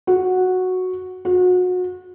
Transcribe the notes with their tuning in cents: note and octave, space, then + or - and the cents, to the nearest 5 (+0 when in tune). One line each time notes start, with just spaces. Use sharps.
F#4 -5
F#4 -30